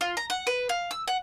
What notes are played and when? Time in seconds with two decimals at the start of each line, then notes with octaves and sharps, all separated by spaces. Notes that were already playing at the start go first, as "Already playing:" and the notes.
0.01 F4
0.17 A#5
0.30 F#5
0.47 B4
0.69 F5
0.91 E6
1.07 F#5